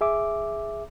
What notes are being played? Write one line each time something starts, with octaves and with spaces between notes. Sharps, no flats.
G#4 E5 D6